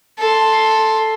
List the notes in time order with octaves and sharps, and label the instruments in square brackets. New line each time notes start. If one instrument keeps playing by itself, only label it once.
[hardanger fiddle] A4 C6